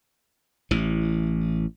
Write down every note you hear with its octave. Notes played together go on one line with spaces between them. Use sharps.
A1 E3